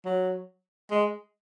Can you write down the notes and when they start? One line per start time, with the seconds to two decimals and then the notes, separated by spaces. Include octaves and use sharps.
0.05 F#3
0.91 G#3